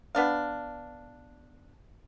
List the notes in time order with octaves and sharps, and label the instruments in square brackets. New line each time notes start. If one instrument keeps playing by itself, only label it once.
[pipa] B3 D4 F5